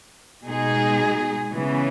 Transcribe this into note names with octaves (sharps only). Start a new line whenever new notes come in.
B2 G#3 D#4 G#4
C#3 E3 B3